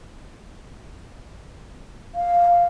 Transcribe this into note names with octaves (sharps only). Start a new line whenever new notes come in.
F5